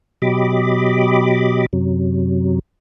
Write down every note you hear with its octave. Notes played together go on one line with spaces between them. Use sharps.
B2 F#3 G4 D#5 B5 D6
F#2 C3 F#3